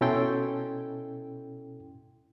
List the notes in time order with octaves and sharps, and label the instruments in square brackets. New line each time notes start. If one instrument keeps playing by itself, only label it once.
[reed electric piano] B2 C#4 E4 A4 G5 C6